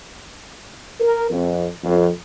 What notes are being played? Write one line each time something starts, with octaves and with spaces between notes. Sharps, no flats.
A#4
F2
F2